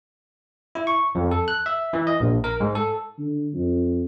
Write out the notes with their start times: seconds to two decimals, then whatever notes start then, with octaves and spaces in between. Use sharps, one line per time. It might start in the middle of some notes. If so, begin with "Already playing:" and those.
0.75 E4
0.87 C#6
1.15 F2
1.31 A4
1.48 F#6
1.66 E5
1.93 E3
2.07 D#5
2.20 A#1
2.44 A#4
2.60 G#2
2.75 A4
3.18 D3
3.54 F2